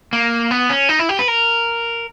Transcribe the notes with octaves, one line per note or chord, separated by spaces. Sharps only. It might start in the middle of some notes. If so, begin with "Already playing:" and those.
A#3
B3
C#4
D#4
E4
G4
B4
A#4